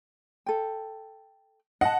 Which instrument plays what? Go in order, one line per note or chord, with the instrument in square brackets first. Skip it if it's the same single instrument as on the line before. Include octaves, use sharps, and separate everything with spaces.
[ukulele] A4 G5
[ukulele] D#5 A5 [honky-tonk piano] F#5